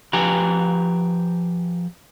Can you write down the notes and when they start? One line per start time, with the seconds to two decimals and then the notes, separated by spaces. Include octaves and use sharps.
0.13 F3 G4 B4 G5 G#5 A#5